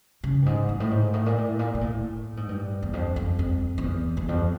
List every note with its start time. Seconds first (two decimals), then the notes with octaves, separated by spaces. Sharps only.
0.24 C#3
0.42 G2
0.46 G#2
0.69 G#2
0.80 A2
0.91 G#2
1.13 A2
1.26 A#2
1.38 A2
1.59 A#2
1.75 A#2
1.81 A2
2.37 G#2
2.49 G2
2.82 E2
2.93 F2
3.16 F2
3.39 F2
3.78 F2
3.83 E2
4.17 E2
4.29 F2